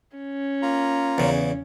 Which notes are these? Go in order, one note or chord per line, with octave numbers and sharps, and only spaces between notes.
C#4
A#3 F4 A#5
E2 C#3